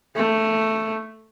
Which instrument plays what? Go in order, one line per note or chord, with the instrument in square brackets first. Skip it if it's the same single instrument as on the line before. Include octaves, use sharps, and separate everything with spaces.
[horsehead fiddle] A3